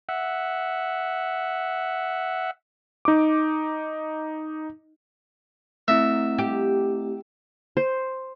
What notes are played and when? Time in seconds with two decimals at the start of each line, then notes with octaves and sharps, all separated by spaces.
0.09 E5 F#5
3.05 D#4 D6
5.88 A3 C4 E4 E5
6.38 G4
7.77 C5